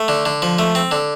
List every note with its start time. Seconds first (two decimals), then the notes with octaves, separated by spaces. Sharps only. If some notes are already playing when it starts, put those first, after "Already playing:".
Already playing: A3
0.08 D3
0.25 D3
0.42 F3
0.59 A3
0.75 C4
0.91 D3